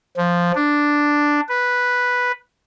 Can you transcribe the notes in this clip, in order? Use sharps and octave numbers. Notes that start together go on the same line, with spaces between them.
F3
D4
B4